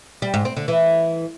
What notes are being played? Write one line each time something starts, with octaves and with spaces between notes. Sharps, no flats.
G3
G#2
C4
D3
E3